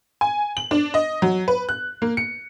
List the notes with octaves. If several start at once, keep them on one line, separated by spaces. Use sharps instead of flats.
G#5
F#7
D4
D#5
F#3
B4
F#6
A#3
C#7